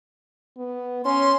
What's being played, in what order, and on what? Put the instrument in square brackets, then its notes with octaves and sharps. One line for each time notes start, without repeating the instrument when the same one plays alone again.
[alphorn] B3
[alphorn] C#4 [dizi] C6